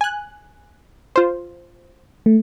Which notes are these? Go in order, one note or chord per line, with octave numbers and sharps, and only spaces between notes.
G#5 F#6
F4 C5
A3